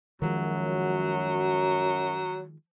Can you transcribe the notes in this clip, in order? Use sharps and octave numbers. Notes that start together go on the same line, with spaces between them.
F#2 D#3 F3 F#3 G#3